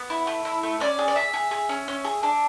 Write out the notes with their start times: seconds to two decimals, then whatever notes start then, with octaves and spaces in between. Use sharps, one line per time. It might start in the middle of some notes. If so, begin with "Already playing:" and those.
Already playing: B3
0.10 E4
0.27 A3
0.45 E4
0.63 A3
0.80 C#4 D5
0.99 G#4
1.08 D5
1.16 G#4 E5
1.34 G#4
1.51 G#4
1.69 C#4
1.88 C#4
2.04 G#4
2.23 D4